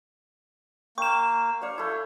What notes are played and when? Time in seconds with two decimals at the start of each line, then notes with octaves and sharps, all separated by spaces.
0.98 A#3 G5 C#6 E7
1.62 C#5 D5 F5
1.78 A3 E4